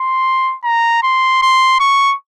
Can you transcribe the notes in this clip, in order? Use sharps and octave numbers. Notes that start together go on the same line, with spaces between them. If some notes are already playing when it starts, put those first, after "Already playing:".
Already playing: C6
A#5
C6
C6
C#6